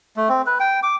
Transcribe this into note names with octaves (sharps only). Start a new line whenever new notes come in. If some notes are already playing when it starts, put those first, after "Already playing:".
A3
C4
B4
G5
D6